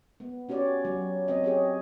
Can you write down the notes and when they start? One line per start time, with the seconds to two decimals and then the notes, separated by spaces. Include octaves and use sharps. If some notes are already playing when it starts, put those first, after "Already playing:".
0.20 B3
0.49 C#4 F#4 G4 C#5 D5
0.85 F#3
1.28 C4 D#5
1.44 G4 G#4 C#5